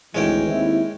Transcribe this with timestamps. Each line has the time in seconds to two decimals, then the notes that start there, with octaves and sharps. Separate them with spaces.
0.15 G#1 D2 E3 G#3 C#4 G5
0.49 D#2 C4 E4